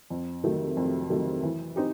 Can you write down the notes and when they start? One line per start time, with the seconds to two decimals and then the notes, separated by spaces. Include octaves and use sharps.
0.10 F2
0.44 C3 D#3 F#3 A3
0.77 F2
1.10 C3 D#3 F#3 A3
1.43 E3
1.76 C4 D#4 G4